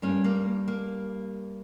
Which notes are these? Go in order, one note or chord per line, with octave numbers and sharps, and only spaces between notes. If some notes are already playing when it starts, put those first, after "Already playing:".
G2 G3 A#3 C#4
A#3
A#3